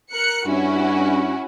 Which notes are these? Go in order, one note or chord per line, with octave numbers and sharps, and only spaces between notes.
A#4 F#6 C#7
G2 C#4 E4 F#4